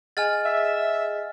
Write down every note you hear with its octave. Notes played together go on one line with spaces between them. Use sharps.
G#4 D#5 F#5 G#5 F6 A6
E5